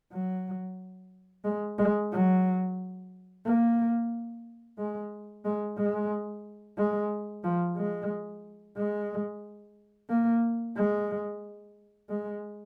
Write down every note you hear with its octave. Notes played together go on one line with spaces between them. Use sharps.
F#3
G#3
G#3
F#3
A#3
G#3
G#3
G#3
G#3
F3
G#3
G#3
A#3
G#3
G#3